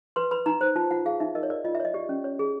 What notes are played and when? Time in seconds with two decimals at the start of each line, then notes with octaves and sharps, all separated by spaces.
0.16 B4 C6
0.31 B4 B5
0.46 D#4 A#5
0.61 C5
0.76 F4 A5
0.91 F4 F#5
1.05 G#4 F5
1.20 D#4 E5
1.35 A#4 D#5
1.43 C#5
1.50 A#4 D5
1.65 F4 D#5
1.75 E5
1.80 C#5
1.85 D#5
1.94 G4 D5
2.09 C#4
2.24 C#5
2.39 G#4